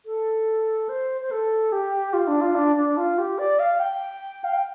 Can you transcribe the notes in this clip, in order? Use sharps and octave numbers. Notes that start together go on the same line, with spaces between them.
A4
C5
C5
A4
G4
F4
D4
F4
D4
D4
F4
G4
D5
F5
G5
F5
G5